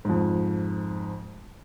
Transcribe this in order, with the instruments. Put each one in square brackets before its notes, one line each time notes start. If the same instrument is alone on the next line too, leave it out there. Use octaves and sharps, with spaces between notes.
[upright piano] F2 G#2